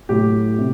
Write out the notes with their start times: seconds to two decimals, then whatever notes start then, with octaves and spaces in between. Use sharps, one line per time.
0.09 A2 F#3 G4
0.58 C3